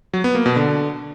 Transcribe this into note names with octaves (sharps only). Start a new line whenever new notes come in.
F#3
B3
A#3
B2
D3